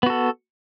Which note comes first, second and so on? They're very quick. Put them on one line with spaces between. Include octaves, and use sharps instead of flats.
B3 F#4 A4